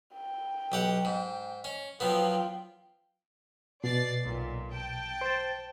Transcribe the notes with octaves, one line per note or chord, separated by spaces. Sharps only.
G5
B1 G4 F#5
G#2
C#4
F3 F#3 B3 F4 G5
B2 D5 A6 C7
B1 A#2
G5 A5
C5 A6